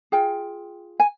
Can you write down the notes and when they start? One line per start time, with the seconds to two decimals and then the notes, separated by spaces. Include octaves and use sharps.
0.12 F4 G#4 G5
1.00 G#5